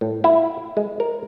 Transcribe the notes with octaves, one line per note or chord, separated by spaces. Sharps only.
A2
E4
G#3
A#4